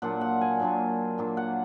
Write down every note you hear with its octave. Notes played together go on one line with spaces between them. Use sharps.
A#2 F#3 D4 F4 F#5
F#5
G#5
A#2 F#3 D4 F4
A#2 F#3 D4 F4
F#5